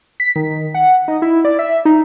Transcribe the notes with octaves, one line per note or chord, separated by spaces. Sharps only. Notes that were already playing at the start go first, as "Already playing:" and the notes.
B6
D#3
F#5
D#4
E4
D5
E5
D#4